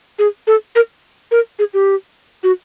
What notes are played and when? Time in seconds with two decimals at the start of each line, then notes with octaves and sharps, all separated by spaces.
0.19 G#4
0.47 A4
0.76 A#4
1.31 A#4
1.59 G#4
1.74 G4
2.43 F#4